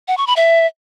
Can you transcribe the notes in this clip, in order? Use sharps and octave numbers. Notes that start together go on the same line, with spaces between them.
F#5
C#6
B5
E5